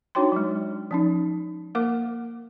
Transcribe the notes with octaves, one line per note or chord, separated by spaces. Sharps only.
D4 D#4 F#4 C#5 G5 C6
F#3 G#3
F3 C#4 D#4
A#3 A#4 F#5 D6